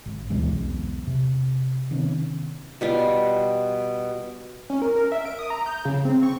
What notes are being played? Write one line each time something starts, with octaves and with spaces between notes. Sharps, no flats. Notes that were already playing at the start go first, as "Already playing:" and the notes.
G#1
D2 B2 E3 G#3
B1 E2
C3
C3 D#3 B3 C#4
B2 G3 F4
C#4
A#4
A#4
E5
D7
D#6
A#5
G6
C#3
C4
C#6